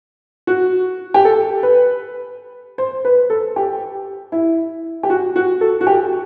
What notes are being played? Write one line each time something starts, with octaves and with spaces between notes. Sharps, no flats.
F#4
G4
A4
B4
C5
B4
A4
G4
E4
G4
F#4
F#4
A4
F#4
G4